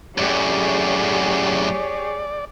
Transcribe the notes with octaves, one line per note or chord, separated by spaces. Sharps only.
F#2 A2 G4 G#4 C#5 D5